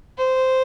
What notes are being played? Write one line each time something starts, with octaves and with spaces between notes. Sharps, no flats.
C5